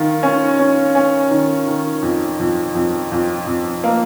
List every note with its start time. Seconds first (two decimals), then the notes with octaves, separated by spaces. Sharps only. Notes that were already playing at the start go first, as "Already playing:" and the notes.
Already playing: D#3 F4
0.23 C#4
0.59 C#4
0.95 C#4
1.31 D#3
1.67 D#3
2.02 F2
2.40 F2
2.75 F2
3.12 F2
3.47 F2
3.84 A#3